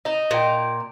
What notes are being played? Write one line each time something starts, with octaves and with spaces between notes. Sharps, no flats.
D#4 D#5
A#2 G5